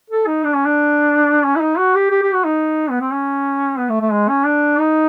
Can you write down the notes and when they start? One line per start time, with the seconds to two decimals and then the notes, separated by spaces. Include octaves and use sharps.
0.10 A4
0.27 D#4
0.44 D4
0.55 C#4
0.66 D4
1.44 C#4
1.56 E4
1.61 D#4
1.78 F#4
1.95 G4
2.11 G4
2.23 G4
2.34 F#4
2.45 D#4
2.90 B3
3.01 C4
3.12 C#4
3.79 B3
3.89 A3
4.01 A3
4.12 G#3
4.29 C#4
4.45 D4
4.79 D#4